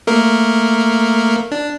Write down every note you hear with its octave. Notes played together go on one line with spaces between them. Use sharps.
A3 A#3 A#4
D4